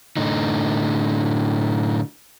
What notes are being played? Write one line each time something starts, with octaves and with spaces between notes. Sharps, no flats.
A2 D3 D#4